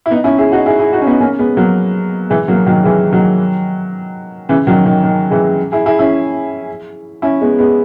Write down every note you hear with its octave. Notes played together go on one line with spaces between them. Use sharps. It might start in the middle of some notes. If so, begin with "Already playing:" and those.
E4
B3 D#4
C#4 E4
E4 G#4
D#4 F#4
E4 G#4
E4 G#4
D#4 F#4
C#4
B3 D#4
A#3 C#4
G#3 B3
F#3 A#3
E3 G#3
F#3 A#3
D#3 F#3
E3 G#3
D#3 F#3
C#3 E3
D#3 F#3
D#3
D#3
E3 G#3
E4 G#4
E4 G#4
C#4 E4
C#4 E4
G#3 B3
G#3 B3